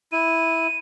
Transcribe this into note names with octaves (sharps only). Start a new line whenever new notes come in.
E4 D#7